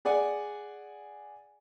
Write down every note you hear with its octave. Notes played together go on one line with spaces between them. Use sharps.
G#4 D5 F#5 G#5